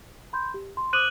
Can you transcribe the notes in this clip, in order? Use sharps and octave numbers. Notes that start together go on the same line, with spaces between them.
B5 C6 G6
G4
C6
C5 D6 D#6 F#6 D#7 F#7